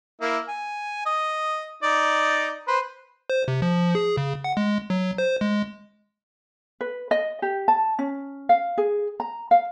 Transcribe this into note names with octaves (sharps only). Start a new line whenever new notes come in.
A#3 E4
G#5
D#5
D#4 D5
B4 C5
C5
C3
F3
G#4
C#3
F#5
G#3
F#3
C5
G#3
B4
D#5
G4
A5
C#4
F5
G#4
A#5
F5